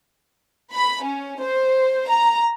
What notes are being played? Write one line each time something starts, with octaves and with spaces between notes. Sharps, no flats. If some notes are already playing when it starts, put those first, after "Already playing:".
B5
C#4
C5
A#5